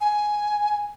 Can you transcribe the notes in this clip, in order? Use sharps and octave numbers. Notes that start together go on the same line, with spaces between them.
G#5